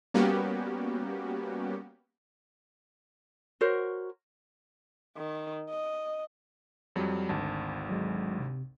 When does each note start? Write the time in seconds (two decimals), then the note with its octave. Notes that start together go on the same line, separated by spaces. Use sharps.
0.14 G3 A#3 B3 C#4 F#4 G4
3.61 F#4 A#4 C5 C#5
5.17 D#3
5.70 D#5
6.96 F2 F#3 G3
7.29 G#1 D2 A5
7.89 F#3 G#3
8.40 C3